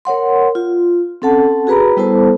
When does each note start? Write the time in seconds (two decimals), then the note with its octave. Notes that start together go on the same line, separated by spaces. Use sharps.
0.05 A#4 C#5 F#5 C6
0.55 F4
1.22 C4 C#4 A4 F#5 A5
1.67 F#4 G#4 B4 A#5 B5
1.97 G3 B3 E4 A4 C5 A5